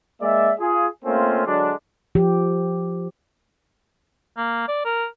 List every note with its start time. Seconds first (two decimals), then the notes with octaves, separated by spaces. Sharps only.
0.21 G#3 A#3 D5 E5
0.60 F4 G#4
1.04 A3 A#3 C4 C#4 F4
1.46 D3 F#3 G#3 D4
2.15 F3 G4
4.37 A#3
4.68 D5
4.85 A#4